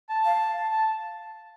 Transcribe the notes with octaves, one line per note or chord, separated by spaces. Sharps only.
A5
F5
A5
A5